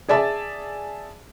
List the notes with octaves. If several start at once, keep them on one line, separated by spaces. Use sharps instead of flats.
G#4 D5 E5 A5